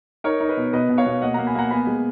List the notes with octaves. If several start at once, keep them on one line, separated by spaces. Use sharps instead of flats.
D#4 A#4 C#5
D#4
B4 D#5
B2
B2 B4 D#5
B2
C#5 F5
B2
A#3 D#5 F#5
F#5 A#5
A#3
G#5 B5
A#3 F#5 A#5
B3 G#5 B5
G#3